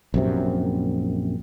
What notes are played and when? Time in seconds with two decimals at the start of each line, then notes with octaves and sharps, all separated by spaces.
0.14 A#1 F#2 C3